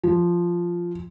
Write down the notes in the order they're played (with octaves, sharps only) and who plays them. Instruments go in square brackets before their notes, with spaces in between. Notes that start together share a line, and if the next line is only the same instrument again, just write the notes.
[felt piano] F3